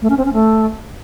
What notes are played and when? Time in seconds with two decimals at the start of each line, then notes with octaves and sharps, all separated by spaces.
0.02 A3
0.10 C#4
0.18 C4
0.25 C#4
0.33 A3